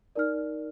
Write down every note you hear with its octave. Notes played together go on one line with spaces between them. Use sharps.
D#4 A#4 D5 F6